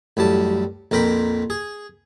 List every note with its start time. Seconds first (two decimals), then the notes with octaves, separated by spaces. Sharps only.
0.17 A1 F#2 G3 A5
0.91 A#1 F2 A#4 G5 B5
1.50 G#4